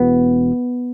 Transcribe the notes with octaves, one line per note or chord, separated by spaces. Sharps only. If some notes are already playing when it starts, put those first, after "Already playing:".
Already playing: E1 E2 B2 B3